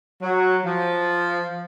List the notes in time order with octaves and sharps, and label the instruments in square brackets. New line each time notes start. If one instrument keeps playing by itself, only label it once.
[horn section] F#3
F3